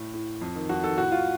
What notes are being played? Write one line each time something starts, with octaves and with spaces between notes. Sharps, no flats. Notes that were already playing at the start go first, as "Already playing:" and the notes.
Already playing: A2
A2
F2
D#3
F2 F#4
D#3 A4
A2 F#4
F4